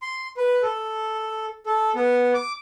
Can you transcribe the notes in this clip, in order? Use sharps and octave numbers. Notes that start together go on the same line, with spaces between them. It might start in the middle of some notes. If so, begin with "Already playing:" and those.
C6
B4
A4
A4
B3
D6